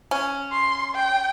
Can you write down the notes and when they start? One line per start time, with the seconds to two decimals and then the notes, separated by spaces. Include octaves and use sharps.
0.11 C#4
0.52 C6
0.95 G5